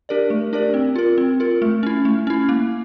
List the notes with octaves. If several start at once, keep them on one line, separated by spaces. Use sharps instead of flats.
D4 G4 A#4 D5
A3
D4 G4 A#4 D5
C4
F4 A#4
C4
F4 A#4
A3
C#4 E4
A3
C#4 E4
A#3